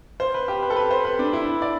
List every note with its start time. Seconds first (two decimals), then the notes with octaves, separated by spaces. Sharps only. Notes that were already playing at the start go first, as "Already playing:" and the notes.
0.20 C5
0.34 B4
0.48 G4
0.62 B4
0.70 A4
0.76 B4
0.91 C5
1.05 B4
1.19 D4
1.33 E4
1.62 D5